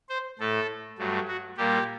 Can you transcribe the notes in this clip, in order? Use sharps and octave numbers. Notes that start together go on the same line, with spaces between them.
C5
A2 A3 A4
G2 F#3 A3
F#4
A#2 G3 A#3 G4